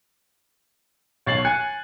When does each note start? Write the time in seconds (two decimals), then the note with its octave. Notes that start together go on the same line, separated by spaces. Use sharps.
1.26 B1 C#5 A6 C7 F#7
1.45 G#5 F#6 G#6 C#7